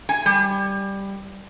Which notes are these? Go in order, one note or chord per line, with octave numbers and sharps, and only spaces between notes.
G#5
G3